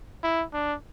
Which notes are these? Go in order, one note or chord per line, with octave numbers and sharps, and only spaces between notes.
E4
D4